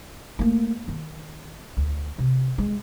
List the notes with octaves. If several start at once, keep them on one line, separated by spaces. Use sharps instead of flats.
A3 A#3
D#3
D2
C3
G#3